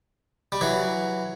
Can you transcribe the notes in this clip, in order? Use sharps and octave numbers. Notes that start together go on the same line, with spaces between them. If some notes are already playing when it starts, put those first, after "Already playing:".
G3
E3 F#3